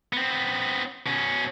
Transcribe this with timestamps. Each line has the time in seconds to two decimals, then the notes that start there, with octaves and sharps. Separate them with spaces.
0.13 B3 C4
1.07 B2 C#4